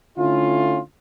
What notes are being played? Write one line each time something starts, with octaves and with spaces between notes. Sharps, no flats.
D3 A3 C#4 E4 F4